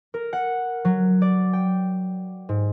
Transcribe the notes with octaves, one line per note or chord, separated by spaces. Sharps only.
A#4
F#5
F#3
D5
G5
G#2